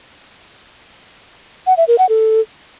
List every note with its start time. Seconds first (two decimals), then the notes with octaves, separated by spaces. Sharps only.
1.67 F#5
1.77 E5
1.88 A#4
1.98 F#5
2.09 A4